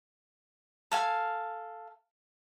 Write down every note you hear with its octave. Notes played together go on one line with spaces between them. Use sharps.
A4 F5 G#5